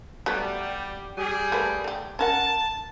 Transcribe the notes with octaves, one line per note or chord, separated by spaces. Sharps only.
F#3 G3 A3 B3
G3 G#4
A3 A#3 B4
A3 G4
C#4 A#4 F#5 A5